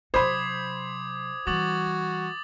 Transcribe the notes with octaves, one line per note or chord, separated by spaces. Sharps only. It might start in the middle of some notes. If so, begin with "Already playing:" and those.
C3 F#3 C5 B5 D6 D#6 G#6
E3 G3 F#4 D6 A6 F#7